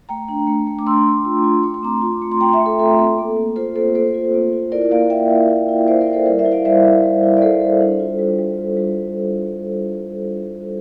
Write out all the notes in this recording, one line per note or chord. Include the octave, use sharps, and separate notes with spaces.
A3 G5 A#5
D4
A3
A3
D6
D4 C6 E6
A3
F4
F4
A3 D6
C6
C4 A#5 D6
F4
A3
C6
A3 G5 A#5
E5 G5
A3
A4
F4 A4
C4
A#3
A#3
F4 A4 C5
A#3 A4 C5
A#3 A4 C5
F4
A#3
F4
E4 A#4 D5
A#3 D5 F5
A#3 E5 G5
E4
E4
E4
A#3 C5 E5
A#4 D5
E4
A4 C5
G3 A#4 D5
C5 E5
E4
D5 F5
G3 C5 E5
G3
G3
E4
D5
G3 A4 C5
G3
D4
F4
G3
G3
F4
G3